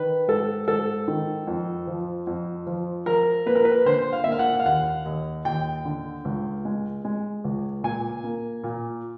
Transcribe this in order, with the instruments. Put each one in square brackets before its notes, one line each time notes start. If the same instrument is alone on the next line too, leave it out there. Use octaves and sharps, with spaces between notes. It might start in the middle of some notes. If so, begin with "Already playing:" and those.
Already playing: [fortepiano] D#3 B4
G#2 A4
G#2 A4
D#3
F2
F3
F2
F3
F3 A#4
A#3 B4
A#4
B4
D3 C5
F5
A#3 E5
F5
F#5
F5
D#2 F#5
D#2
D#2 G5
D3
C#2
G#3
G#3
C#2
A#2 G#5
A#3
A#2